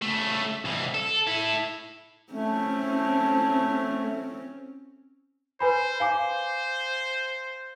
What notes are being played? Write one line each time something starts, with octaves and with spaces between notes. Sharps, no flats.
C#3 A3
C2 E3
A4
E4 A4
A3 C4 C#4
B4 C5 G#5 B5
C5 F5 G#5 D6